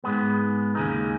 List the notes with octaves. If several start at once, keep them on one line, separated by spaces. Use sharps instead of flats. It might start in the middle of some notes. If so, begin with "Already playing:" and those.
G#2 G#3 B3
D#2 C#3 G#3 D#4